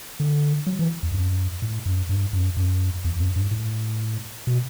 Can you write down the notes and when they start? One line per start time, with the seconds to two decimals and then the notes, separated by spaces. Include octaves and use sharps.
0.20 D3
0.67 F#3
0.79 E3
1.03 E2
1.14 F#2
1.62 A2
1.86 F#2
2.09 G2
2.33 F#2
2.57 F#2
3.05 E2
3.20 F#2
3.36 G2
3.51 A2
4.47 B2